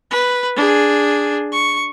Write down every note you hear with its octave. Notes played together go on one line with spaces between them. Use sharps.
B4
D4 G#4
C#6